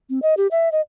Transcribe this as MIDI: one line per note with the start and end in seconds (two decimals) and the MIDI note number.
0.10 0.20 60
0.22 0.34 75
0.37 0.47 67
0.51 0.69 76
0.72 0.81 75